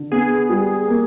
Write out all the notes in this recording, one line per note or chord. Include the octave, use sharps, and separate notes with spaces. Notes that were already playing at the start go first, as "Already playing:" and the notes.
Already playing: D3
B3 G#4
G3
A#3